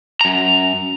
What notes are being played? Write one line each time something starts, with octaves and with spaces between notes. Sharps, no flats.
F#2 A#5